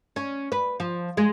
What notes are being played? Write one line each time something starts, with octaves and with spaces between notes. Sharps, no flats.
C#4
B4
F3
G#3